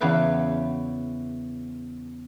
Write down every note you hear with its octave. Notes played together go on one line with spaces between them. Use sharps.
E2 C#3 B4 E5